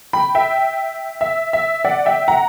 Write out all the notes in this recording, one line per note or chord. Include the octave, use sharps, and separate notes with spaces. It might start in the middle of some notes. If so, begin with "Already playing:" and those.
G5 B5
E5 G5
E5
E5
D5 F#5
E5 G5
F#5 A#5